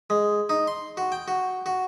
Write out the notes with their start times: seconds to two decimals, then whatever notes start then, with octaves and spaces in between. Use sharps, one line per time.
0.10 G#3
0.49 D#4
0.67 C6
0.97 F#4
1.12 G5
1.28 F#4
1.66 F#4